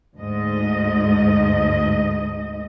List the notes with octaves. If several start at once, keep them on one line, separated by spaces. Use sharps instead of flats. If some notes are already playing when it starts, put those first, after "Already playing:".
D2 G#2 D#5